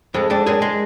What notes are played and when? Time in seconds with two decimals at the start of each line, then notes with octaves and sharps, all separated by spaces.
0.14 F2 G#3
0.30 F2 D4
0.46 F#2 G#4
0.62 G#3